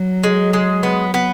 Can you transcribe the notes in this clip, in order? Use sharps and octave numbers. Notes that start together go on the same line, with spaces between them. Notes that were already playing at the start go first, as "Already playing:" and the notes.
Already playing: F#3
G#3
G#3
B3
B3